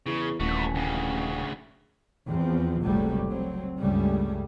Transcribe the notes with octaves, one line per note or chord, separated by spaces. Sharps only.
E2 C#3
D#1 A1 A3 F#4
D2 C#3
E2 F3 C4
F#1 C#2 C3 F#3 G3 A3
F#3 C4
C#2 G2 C#3 G3 A3